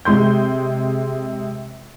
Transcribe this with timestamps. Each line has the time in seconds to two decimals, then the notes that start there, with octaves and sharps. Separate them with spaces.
0.05 C3 G#3 C6 G6